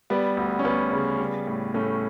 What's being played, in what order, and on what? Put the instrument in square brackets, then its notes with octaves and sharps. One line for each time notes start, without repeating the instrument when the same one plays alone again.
[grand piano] G3 B3
D2
C#4
D2 B3
C#3
G3
A2
A2 A3 C#4